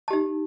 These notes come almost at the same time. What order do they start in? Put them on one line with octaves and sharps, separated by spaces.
A5 G4 D#4